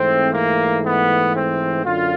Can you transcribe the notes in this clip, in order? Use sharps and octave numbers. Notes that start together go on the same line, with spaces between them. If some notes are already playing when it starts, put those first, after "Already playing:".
Already playing: G#2 E3 A3 C4
A#3
B3
C4
F#2 D3 F4